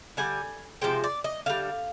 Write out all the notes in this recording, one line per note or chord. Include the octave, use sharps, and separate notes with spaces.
D3 G3 G#5
C3 F3 G#3 G5
D5
D#5
D3 G3 F5